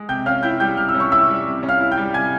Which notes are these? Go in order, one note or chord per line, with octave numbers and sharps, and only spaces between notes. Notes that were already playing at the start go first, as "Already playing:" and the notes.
Already playing: G#3
C3 G5 G6
C#4 F5 F6
E4 G5 G6
G3 G5 G6
C3 F6
E6
C#4
C#6
E4 E5 E6
G3
C3
C#4
F5 F6
E4
G5 G6
G3
C3 G#5 G#6